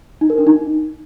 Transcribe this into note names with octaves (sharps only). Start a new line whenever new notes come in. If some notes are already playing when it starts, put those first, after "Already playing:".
D#4
A#4
D4
D#4